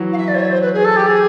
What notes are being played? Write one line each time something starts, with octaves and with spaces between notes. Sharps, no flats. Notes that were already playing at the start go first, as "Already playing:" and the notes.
Already playing: E3 F#3
F5
E5
D5
C5
C#5
C5
B4
G#4
A4
G4
G#4